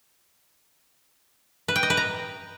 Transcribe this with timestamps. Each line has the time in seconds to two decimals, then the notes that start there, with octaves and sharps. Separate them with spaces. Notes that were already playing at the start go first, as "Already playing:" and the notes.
1.68 B4
1.76 G5
1.83 D#5
1.90 B4
1.97 A#5